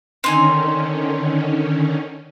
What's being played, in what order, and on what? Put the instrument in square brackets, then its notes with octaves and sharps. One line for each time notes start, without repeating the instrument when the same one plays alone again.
[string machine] D3 D#3 C#4 [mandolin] C4 D#4 G#5